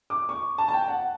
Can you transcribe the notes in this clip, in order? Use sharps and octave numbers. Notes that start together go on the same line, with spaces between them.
D6
C#6
A5
A5
G5
F#5